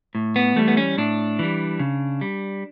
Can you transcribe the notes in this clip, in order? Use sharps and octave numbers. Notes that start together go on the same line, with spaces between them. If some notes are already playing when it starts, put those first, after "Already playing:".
A2
B3
E3 G3 A3
B3
C#4
A2 D4
E3 G3
C#3
G3